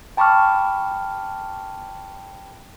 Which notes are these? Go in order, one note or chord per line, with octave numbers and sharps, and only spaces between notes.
G5 A5 B5 C#6 D6 F6